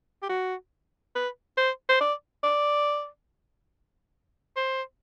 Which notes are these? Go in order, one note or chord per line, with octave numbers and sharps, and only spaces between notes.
G4
F#4
B4
C5
C5
D5
D5
C5